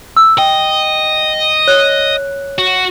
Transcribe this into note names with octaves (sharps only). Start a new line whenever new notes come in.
E6
D#5 G5
C#5 F#6
F#4